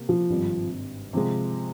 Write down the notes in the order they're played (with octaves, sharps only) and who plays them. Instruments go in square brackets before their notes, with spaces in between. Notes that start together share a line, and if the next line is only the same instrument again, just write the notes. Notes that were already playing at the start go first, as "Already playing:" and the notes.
Already playing: [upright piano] C3 A#3 G4
[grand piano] F3
[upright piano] G#1 G2 G3 C4
C3 F3 G#3